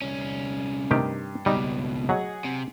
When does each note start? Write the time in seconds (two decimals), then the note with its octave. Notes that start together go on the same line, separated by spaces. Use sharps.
0.02 C2 C#4
0.91 G2 C3 D#3 G4
1.46 C#2 B2 G3 D#4
2.09 F#3 G#4 D#5 F#5
2.45 C3